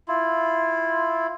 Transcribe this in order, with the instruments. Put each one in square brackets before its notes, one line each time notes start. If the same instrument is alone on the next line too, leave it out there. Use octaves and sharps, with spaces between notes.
[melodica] E4 F4